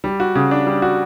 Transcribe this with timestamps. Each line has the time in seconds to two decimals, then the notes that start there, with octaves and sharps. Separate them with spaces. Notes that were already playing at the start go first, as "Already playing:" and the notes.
0.04 G3
0.20 F#4
0.35 C#3
0.51 D4
0.67 G3
0.82 F#4